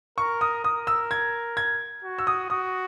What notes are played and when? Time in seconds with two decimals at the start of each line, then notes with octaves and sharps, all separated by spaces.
0.18 A#4 C#6
0.41 D#6
0.64 A#4 D#6
0.87 E6
1.11 G#6
1.57 G#6
2.04 F#4
2.19 E6
2.27 D#6
2.50 F#4 D#6